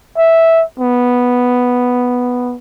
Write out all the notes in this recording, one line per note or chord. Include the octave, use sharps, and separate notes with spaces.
E5
B3